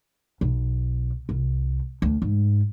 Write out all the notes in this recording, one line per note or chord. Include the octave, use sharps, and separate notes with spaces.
B1
C2
D2
G#2